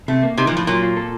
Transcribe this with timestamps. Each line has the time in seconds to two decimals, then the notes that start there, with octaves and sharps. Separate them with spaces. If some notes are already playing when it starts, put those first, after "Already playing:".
0.08 C3 A3
0.23 A#3
0.38 C3 D#4
0.47 A#2
0.52 A2 F3
0.67 A#2 F#3
0.82 F4
0.97 A4